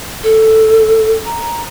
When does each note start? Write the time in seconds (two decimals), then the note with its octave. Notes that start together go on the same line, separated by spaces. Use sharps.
0.23 A4
1.25 A#5